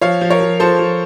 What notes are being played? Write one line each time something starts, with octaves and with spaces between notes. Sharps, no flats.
F3 C#5 F5
F3
A#4 C#5
F3
F3 A4 C5
F3